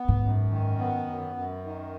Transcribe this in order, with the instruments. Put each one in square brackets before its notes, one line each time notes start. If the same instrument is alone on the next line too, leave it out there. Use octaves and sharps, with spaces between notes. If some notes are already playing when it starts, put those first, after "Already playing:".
Already playing: [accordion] B3
[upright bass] G#2
[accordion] F#2
D#3
B3
F#2
F#2
D#3